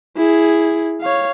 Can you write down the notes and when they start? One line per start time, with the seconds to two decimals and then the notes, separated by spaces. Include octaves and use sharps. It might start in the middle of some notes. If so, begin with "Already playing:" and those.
0.17 E4 G#4
1.01 C#5 F5